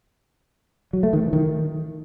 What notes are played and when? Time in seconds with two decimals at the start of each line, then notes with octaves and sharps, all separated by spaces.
0.93 F#3
1.03 A3
1.13 D#3
1.23 E3
1.33 D#3